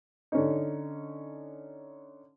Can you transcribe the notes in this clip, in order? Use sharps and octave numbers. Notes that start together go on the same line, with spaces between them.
D3 C#4 D#4